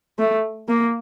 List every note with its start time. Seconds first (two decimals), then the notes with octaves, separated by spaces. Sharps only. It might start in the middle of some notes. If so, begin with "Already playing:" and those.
0.19 A3
0.68 A#3